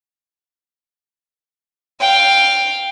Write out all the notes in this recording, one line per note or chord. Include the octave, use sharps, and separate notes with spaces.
F5 G5